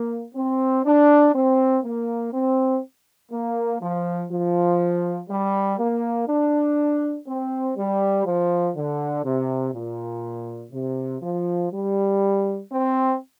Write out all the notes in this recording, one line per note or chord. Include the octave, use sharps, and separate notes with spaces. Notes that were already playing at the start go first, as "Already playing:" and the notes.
Already playing: A#3
C4
D4
C4
A#3
C4
A#3
F3
F3
G3
A#3
D4
C4
G3
F3
D3
C3
A#2
C3
F3
G3
C4